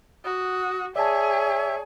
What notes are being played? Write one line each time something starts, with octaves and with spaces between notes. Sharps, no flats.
F#4 D#6
G#4 C#5 D5 E5 A5